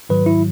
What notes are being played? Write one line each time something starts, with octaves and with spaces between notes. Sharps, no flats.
G#2 D#3 F#3 B4
E4